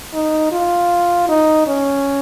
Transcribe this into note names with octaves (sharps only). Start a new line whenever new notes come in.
D#4
F4
D#4
C#4